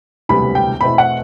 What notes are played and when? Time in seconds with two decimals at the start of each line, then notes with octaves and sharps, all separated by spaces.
0.29 E1 D2 C3 G3 B3 B5
0.55 G5
0.81 E2 B2 A3 C4 B5
0.98 F#5